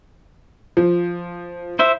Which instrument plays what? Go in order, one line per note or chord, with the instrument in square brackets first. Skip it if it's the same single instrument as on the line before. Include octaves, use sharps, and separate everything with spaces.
[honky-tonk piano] F3
[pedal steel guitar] E4 C5 E5